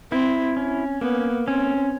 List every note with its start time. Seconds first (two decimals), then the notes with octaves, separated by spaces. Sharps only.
0.11 C4 E4
0.57 C#4
1.01 A#3 B3
1.47 C4 C#4